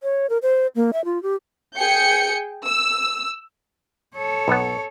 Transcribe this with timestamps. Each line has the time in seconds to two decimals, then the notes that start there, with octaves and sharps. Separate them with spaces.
0.03 C#5
0.30 A#4
0.42 C5
0.75 A#3
0.93 E5
1.05 F4
1.23 G4
1.77 G#4 G5 G6 C#7
2.65 E6
4.15 A4 C#5
4.48 B1 B3